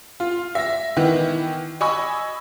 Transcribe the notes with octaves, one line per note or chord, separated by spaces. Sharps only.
F4
E5 A#6
D#3 E3 B3 E4
D#5 G#5 B5 C#6 E6